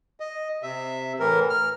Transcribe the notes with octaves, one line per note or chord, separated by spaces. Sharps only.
D#5
C3 E5
A2 E3 A#4
F6